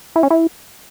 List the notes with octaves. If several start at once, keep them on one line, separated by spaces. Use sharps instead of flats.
E4
C#4
E4